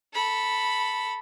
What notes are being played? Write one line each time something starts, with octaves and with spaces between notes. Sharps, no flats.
A4 B5